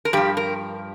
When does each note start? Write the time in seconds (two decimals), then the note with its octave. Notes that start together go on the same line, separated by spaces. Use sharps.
0.05 A#4
0.13 G2 F3 G4
0.37 A#4